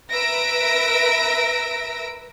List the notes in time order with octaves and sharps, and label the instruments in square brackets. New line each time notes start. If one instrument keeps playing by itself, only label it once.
[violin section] A#4 B4 E5 E6 A#6 D7